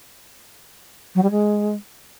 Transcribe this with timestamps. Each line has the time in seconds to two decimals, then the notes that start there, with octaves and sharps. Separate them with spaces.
1.15 F#3
1.22 G3
1.30 G#3